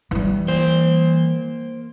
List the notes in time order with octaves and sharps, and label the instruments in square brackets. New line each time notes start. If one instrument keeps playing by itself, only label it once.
[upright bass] E3 G3
[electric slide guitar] A#3 C5